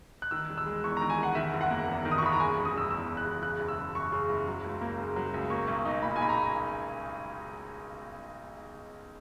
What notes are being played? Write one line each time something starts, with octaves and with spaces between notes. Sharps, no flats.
F#6
D#3 E6
E1
E6
G#3
E2 C#6
A#5
D#3
G#5
E1
F#5
D#3 E5
F#1
F#5
A#3
E2
D#3
D#6
C#6
F#1 B5
A#5
C#3 G#5
E1
D#6
E1 E6
E2 E6
C#3
F#6
E1
C#3 F#6
F#1
E6
F#1
F#2 C#6
C#3
F#1
F#3
C#2
A#3
C#3
F#3
C#2
A#3 C#6
B1
D#4
A#2 B5
G#5
A#3 B5
A#5